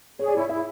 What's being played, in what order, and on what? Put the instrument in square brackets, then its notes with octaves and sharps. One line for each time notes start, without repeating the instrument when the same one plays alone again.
[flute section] G#4 [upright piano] C#5
[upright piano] D5
[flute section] E4 [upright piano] C#5
[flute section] E4 [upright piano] E5